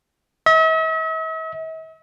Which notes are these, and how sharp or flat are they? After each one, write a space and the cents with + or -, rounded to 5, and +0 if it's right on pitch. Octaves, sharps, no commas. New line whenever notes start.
E5 -45